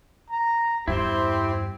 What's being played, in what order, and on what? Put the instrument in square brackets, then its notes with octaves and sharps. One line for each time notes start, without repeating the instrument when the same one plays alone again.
[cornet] A#5
[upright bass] E2 G2 [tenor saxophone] C4 [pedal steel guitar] E4 C5 [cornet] G4